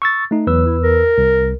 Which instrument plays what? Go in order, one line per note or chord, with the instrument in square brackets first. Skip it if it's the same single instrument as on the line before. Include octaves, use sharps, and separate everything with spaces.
[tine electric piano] C#6 E6 A6
A3 D#4
[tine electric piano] E2 B4 E6 [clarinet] F#3
[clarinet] E4
A#4
[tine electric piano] C2